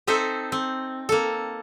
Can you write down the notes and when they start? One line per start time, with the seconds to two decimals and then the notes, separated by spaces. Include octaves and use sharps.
0.07 C4 D#4 A4 C5 E5
0.52 C4
1.09 A#3 A4